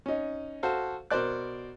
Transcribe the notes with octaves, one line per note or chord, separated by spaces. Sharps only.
C#4 D#4
F#4 A4 C5 F5
B2 A#4 C5 D5 F#6